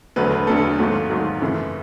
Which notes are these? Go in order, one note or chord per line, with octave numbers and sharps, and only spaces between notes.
E1 D2 D3 F#3 A3 B4
B4
E1 D2 D3 F#3 A3 A4
G#1 G#2 F#3 A3
G#1 G#2 F#3 A3
F#2 C#3 E3 A3